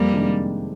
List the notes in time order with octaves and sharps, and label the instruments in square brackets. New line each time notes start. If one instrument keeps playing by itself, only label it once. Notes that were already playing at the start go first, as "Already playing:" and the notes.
Already playing: [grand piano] F2 [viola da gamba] G3 A#3
[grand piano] C3 D#3 G#3 D4